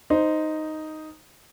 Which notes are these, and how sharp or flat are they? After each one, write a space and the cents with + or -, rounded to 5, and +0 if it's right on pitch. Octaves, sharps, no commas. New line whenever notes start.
D#4 +0 C5 -5